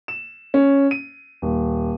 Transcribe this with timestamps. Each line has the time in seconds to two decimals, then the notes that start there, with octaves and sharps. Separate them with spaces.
0.08 E7
0.54 C#4
0.91 D#7
1.42 D#1